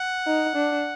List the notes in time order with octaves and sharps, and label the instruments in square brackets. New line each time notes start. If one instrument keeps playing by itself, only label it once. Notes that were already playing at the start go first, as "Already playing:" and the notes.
Already playing: [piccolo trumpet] F#5
[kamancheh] D#4
D4